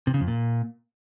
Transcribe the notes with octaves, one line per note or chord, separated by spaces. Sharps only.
C3
C#3
F2
A#2